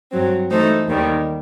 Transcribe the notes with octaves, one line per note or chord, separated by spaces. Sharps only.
G2 F#3 C4
E3 A3 D#4 A4 C5
D#2 D#3 G3